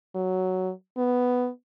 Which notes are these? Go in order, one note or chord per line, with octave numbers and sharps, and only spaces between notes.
F#3
B3